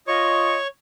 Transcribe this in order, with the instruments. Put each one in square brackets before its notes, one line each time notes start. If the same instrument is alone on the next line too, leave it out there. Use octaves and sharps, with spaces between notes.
[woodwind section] F4 D#5 [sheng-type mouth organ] C#5 C#6